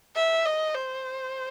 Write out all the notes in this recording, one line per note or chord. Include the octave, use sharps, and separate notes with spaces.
E5
D#5
C5